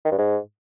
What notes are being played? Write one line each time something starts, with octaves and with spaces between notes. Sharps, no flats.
D#3
G2
G#2